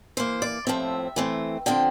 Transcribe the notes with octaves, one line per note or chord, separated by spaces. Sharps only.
E3 A#3 C5
D5
A2 F3 C4 E5
E3 A3 C4
D3 F3 C4 G5